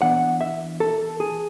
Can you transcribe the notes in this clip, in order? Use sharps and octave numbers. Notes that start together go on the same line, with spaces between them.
E3 B3 D4 F#5
E5
A4
G#4